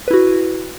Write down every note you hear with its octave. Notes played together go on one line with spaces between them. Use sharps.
E4 F#4 B4